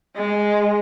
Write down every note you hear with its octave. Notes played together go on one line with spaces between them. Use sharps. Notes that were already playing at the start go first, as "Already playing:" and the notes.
G#3